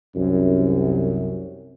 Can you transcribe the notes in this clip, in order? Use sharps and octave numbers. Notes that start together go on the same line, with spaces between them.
C2 F#2